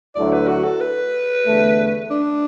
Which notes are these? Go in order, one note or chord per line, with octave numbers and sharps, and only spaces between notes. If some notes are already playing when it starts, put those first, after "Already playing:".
D2 D3 F#3 A3 E4 D5
B4
F#4
A4
B4
E2 D3 A3
D4